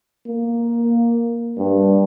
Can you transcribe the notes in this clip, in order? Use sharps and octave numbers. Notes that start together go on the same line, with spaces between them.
A#3
G2